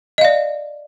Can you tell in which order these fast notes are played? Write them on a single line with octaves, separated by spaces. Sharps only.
D#5 F5 D5